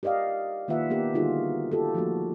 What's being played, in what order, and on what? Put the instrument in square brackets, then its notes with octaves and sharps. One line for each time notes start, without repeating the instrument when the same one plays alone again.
[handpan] G4 A#4 D5 D#5 F5
D#3 A#3 F4 B4 E5 F#5
A#3 B3 G4 A#4
D3 G3 D#4 F4 F#4 G#4
F4 G4 A4
F3 A3 A#3 F#4